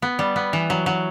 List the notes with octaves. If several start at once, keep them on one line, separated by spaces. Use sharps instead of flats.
B3
G3
B3
E3
F#3
F#3